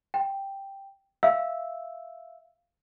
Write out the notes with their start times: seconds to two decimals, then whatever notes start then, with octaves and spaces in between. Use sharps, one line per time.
0.14 G5
1.23 E5 F5 E6